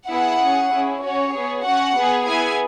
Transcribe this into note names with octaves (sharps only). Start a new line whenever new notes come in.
B3 E4 G#4 F#5
C#4 G#4
C#4 E4 G#4
C#4 F#4 C#5
B3 G#4
C#4 F#4 F#5
B3 G#4
B3 E4 G#4 G#5